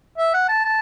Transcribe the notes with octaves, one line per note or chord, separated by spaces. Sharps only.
E5
F#5
A5
A5